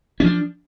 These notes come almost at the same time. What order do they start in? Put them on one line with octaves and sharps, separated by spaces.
C#4 F3 D4